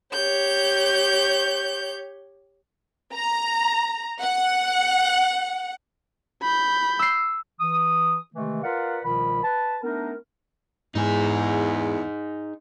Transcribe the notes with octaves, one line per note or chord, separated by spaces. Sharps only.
G4 C#5 G6
A#5
F#5
B5 G6
E6 C7
E3 D#6
C3 D#3 E3 G#3 A3
F4 A#4 B4 D5 F5 F#5
C2 B2 D#3 F3 F4 B5
B4 A5
A3 B3 D4 D#4 A#4
E2 G#2 D#4 G#4